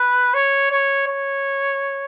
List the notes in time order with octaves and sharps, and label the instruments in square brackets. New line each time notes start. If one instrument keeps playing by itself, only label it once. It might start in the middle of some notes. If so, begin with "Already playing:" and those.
Already playing: [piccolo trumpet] B4
C#5
C#5
C#5